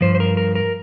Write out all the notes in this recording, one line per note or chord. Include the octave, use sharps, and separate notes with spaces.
G2 F3 C5
C5
A#4
A#4
A#4